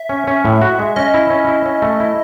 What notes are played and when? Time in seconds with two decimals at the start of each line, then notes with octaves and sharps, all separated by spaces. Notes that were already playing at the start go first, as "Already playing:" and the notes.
Already playing: E5
0.09 C#4
0.27 C#4
0.45 A2
0.61 F#4
0.79 G#3
0.96 C#4 D#5
1.14 E4
1.30 C#4
1.48 E4
1.66 C#4
1.82 A3
2.00 E4